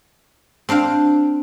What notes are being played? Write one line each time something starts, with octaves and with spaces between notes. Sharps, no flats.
C4 D4 C5 F5